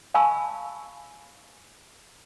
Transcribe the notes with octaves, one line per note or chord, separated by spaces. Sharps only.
F5 G#5 A5 B5 C#6 E6